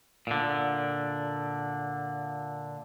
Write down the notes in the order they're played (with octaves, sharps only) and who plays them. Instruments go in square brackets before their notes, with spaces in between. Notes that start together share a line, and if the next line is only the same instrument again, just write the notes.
[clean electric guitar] A#2 D3